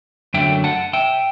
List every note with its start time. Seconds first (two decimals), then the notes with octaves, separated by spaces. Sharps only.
0.34 F#2 D3 F#3 A3 E5 G5
0.64 F#5 A5
0.93 E5 G5